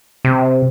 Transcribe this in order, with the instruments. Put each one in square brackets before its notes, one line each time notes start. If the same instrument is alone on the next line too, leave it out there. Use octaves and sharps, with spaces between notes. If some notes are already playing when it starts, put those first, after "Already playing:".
[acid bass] C3